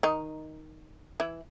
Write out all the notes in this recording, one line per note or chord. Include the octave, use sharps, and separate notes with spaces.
D#3 D#4
E3 E4